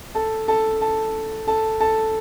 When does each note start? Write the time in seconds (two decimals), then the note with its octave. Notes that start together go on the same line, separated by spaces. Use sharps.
0.15 A4 A5
0.48 A4 A5
0.81 A4 A5
1.47 A4 A5
1.80 A4 A5